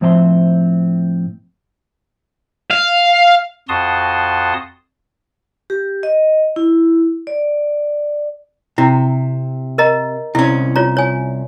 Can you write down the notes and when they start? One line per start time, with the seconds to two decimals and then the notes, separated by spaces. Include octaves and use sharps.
0.01 A2 F3 C4 E5 G5 C6
2.70 F5
3.69 F2 F#4 A5 C6 D#6
5.70 G4
6.03 D#5
6.56 E4
7.27 D5
8.78 C3 E4
9.78 A#4 D#5 A#5
10.35 C2 C#4 E4
10.76 F4 C#5 A#5
10.97 C#5 G#5